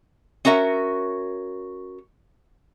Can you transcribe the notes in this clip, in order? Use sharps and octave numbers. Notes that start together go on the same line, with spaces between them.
C#4 F#4 A#4 E5